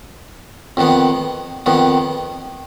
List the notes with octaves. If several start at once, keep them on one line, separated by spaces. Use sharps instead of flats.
F2 D#3 B3
F2 D#3 B3